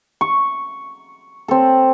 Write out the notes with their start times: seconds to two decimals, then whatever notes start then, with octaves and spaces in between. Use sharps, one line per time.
0.21 C#6
1.48 C4 A4